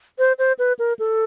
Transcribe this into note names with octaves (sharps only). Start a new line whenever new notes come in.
C5
C5
B4
A#4
A4